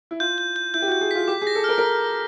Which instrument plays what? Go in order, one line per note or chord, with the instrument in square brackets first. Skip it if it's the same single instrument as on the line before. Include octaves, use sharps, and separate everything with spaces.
[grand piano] E4
[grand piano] F4 [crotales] G6
[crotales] G6
G6
[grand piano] E4 [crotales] G6
[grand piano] G4
F#4
[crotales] G6
[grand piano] G#4
[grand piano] F4 [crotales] B6
[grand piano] G4 [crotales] D6
[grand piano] G#4
[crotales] A#6
[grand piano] A4
[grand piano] A#4 [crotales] F6
[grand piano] A#4